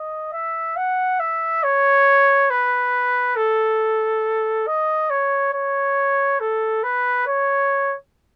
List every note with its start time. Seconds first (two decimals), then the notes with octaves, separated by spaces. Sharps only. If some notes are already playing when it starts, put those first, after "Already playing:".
Already playing: D#5
0.33 E5
0.76 F#5
1.19 E5
1.63 C#5
2.50 B4
3.36 A4
4.67 D#5
5.10 C#5
5.53 C#5
6.40 A4
6.83 B4
7.27 C#5